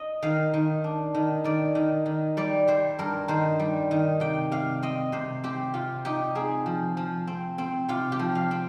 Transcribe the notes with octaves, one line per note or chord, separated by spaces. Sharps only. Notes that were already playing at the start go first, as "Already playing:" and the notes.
Already playing: D#5
D#3 F5
D#3
D4
D#3
D#3 D5
D#3
D#3
G3 D5
G3 C5
G2 A#4
D#3 C5
G3
D#3
C3 G5
C3 F5
C4 D#5
C3 C5
C4 G4
C3 F4
D#4 G4
C4 G#4
F3
F3
C4
C4
C3 F4
G4
F3
F5
C4